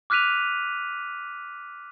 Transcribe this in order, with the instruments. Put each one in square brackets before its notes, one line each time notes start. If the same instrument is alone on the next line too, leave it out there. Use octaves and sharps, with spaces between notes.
[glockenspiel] D6 F6 F#6 B6 D#7 F7